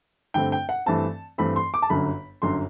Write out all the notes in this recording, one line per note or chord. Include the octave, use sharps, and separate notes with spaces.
G2 D3 A3 C4 G5
G5
F#5
G2 E3 A3 C4 A5
G2 E3 A3 C4 B5
C6
D6
A5
G1 F#2 D3 B5
G1 F#2 D3 C6